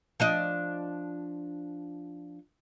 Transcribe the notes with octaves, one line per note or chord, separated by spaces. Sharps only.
F3 D4 D#5